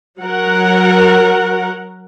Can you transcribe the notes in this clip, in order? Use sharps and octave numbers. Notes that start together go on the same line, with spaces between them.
F#3 A#4 F#5